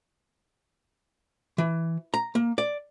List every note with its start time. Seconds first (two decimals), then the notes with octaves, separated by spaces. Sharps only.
1.58 E3
2.14 A#5
2.35 A#3
2.58 D5